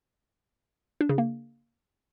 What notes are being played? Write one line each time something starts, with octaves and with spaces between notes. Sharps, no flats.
D4
C#3
A#3